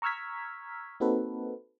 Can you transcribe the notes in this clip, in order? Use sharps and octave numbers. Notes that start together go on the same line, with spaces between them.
A#5 C#6 E6 F6 G#6 B6
A#3 C4 D#4 F#4 A4 B4